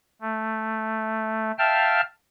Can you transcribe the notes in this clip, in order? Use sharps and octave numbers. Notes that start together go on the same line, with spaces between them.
A3
E5 F5 G5 A5 F6